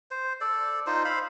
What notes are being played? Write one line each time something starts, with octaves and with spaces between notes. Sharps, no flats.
C5
A4 D5
D#4 F4 C5
C5 F5 B5